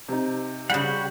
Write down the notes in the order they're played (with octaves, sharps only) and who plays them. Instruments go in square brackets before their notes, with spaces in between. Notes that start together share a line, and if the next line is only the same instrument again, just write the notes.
[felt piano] C3 D#4
[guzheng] C#3 G3 [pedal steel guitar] F#4 G4 F#5